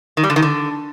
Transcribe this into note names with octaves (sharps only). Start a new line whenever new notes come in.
D#3
G3
D3
D#3
D3